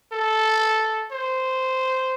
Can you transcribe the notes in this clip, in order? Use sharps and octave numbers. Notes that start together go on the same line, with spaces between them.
A4
C5